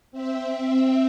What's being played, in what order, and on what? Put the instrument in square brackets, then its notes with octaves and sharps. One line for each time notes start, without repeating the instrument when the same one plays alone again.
[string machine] C4 E5